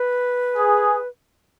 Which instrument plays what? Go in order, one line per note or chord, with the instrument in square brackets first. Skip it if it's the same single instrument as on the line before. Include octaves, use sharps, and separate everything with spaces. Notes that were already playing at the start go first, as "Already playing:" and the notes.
Already playing: [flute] B4
[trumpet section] G#4